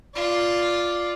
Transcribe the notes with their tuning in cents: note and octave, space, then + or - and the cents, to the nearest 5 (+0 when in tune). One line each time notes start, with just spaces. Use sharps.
F4 +0 D5 +0